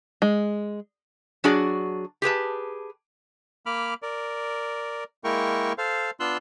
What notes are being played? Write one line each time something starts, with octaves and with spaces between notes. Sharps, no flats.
G#3
F#3 D4 F#4 G#4 D5
G4 G#4 B4 A5
A#3 B5 D6 F6
A#4 D5
G#3 A#3 E4 A#4 G5 C#6
A4 C5 F5
B3 D4 F4 C6 E6 F#6